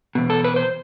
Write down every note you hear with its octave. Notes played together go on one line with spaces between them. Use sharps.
E2 B2
A4
B4
C5